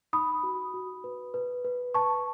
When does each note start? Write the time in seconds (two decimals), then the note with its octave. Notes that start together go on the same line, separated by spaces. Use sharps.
0.13 D#4 B5 D#6
0.43 F#4
0.74 F#4
1.04 B4
1.34 B4
1.65 B4
1.94 B4 A5 C#6